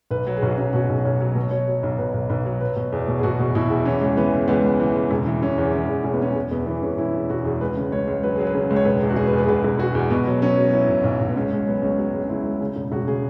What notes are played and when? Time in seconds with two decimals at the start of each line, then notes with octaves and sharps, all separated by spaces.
0.11 B1 B4
0.27 F#3
0.37 G#4
0.42 B1 F#4
0.58 F#3 C#4
0.73 B2 F#4
0.89 B1 G#4
1.05 B1 C#5
1.20 F#3
1.35 B2 B4
1.51 F#3 C#5
1.68 F#3
1.83 B1
1.98 B2 B4
2.14 B1
2.29 B1 B4
2.45 F#3
2.61 F#3 B4
2.76 B2
2.92 E2
3.08 B2
3.19 G#4
3.23 B2 F#4
3.39 B2
3.55 B2 E4
3.70 E2
3.85 E3 C#4
4.01 C#2
4.16 E3 B3
4.33 C#2
4.48 C#2 B3
4.64 C#2
4.80 E3
4.95 C#2
5.11 E1
5.26 E3
5.42 E1 C#4
5.58 E2
5.73 E3 C#4
5.89 E2
6.04 E1 C#4
6.13 B3
6.20 E1 C#4
6.36 E1
6.51 E2 B3
6.66 E3 B3
6.82 E1 C#4
6.98 E1 E4
7.14 E1
7.30 E1 F#4
7.45 E2 G#4
7.61 C#2 B4
7.77 C#3
7.92 C#2 C#5
8.07 C#2
8.23 F#3 B4
8.36 F#3 G#4
8.47 B4
8.55 C#3
8.70 C#2
8.76 C#5
8.85 E1 B4
9.02 E2
9.10 F#4
9.16 E1 G#4
9.27 B4
9.33 E2
9.38 B4
9.44 G#4
9.48 E1 B4
9.64 E1
9.79 E1 F#4
9.95 E2
10.10 B2 B3
10.26 F#3
10.42 F#3 C#4
10.58 F#3
10.72 F#3 E4
10.89 B1
11.04 B1
11.21 B1
11.29 B3
11.36 C#2 C#4
11.51 C#2
11.67 F#3 B3
11.82 C#2 C#4
11.98 F#3
12.13 C#2
12.24 C#4
12.29 C#2 E4
12.45 C#2
12.61 C#3
12.76 E1
12.92 E1 F#4
13.08 C#3 G#4